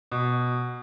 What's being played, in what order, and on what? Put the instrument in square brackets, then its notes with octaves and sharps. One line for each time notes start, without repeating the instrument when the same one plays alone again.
[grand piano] B2